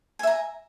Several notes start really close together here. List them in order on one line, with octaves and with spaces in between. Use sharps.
G#5 E5 A#5